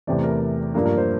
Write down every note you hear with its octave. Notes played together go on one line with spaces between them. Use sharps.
E2 C3 E3 A3 D5
A#4
G2 F3 A#3 D4 A#4
A#4
C5